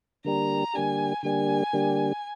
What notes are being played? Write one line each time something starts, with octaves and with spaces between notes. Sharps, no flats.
D3 G3 A#3 D4 G4 A#5
D3 G3 A#3 D4 G4 G#5
D3 G3 A#3 D4 G4 G#5
D3 G3 A#3 D4 G4